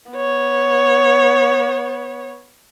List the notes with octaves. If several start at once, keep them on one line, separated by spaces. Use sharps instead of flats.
B3 C#5